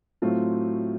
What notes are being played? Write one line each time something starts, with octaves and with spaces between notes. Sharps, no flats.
A2 F#3 A3 C4 F4